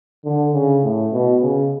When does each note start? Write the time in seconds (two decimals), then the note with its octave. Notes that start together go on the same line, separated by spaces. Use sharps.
0.25 D3
0.54 C#3
0.83 A2
1.13 B2
1.42 C#3